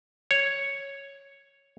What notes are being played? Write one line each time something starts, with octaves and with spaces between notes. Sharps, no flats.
C#5